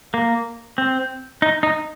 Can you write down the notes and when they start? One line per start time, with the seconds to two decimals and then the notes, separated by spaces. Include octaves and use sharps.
0.14 A#3
0.78 C4
1.42 D#4
1.63 D#4